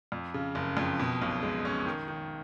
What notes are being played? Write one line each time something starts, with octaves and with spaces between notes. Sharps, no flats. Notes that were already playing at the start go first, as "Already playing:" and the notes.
F2
C#3
F#1
F2
B2
B1
G#3
C#4
D#3
D#3